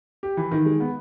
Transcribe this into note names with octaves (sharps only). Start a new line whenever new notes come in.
G4
E3
D#3
G#3
B3